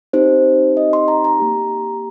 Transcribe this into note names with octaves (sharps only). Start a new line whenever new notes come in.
C4 D#4 G4 C5
D#5
C6
A#5
A#5
A#3 G4